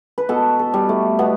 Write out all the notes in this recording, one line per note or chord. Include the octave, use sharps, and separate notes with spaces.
B4
B2 A4
A4
G3
A3
B2 B3